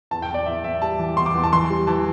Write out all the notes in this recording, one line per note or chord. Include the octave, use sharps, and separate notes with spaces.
E2 A5
G5
E2
D5
E2 E5
E2 E5
G3 A5
E3
E2 C6
D6
E2
A5
E3 C6
G3
E3 A5